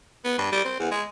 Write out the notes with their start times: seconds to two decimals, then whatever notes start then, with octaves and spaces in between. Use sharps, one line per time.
0.24 B3
0.38 G2
0.52 G3
0.64 C4
0.79 E2
0.91 G#3